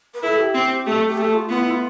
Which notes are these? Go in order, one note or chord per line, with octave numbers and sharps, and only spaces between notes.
B4
E4 A4
G4
C4
A3 A4
G4
A3 A4
F4
B3 F4
E4
F4